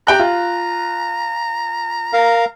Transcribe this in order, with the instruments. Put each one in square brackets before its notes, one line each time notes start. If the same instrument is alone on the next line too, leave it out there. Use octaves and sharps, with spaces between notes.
[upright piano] G4 G5 F#6 [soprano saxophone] A#5
[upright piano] F4
[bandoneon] A#4 F5